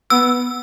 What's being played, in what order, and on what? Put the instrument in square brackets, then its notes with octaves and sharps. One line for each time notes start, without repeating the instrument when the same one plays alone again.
[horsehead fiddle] B3 [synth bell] E6